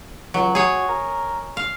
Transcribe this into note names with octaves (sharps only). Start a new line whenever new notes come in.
C#2 F#3
F#4 G#4 C#5
A#4
F5